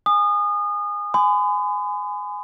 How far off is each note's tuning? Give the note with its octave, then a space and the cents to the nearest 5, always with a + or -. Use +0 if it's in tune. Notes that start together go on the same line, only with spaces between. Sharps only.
G#5 -10 D#6 -30
G#5 +0 B5 +45 D#6 -30